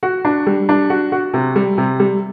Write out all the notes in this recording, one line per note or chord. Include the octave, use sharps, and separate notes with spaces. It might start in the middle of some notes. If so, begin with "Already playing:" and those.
F#4
D4
G3
D4
F#4
F#4
C3
G3
C3
G3